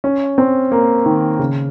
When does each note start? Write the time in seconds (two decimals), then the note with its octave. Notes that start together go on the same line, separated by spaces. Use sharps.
0.04 C#4
0.38 C4
0.72 A#3
1.06 D#3
1.39 C#3